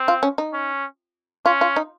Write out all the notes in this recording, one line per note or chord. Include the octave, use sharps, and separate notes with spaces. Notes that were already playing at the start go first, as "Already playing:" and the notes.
Already playing: C4
F4
C#4
D#4
C#4
C#4 F4
F4
D#4